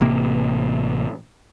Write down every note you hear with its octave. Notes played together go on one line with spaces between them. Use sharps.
A1 C3 A#3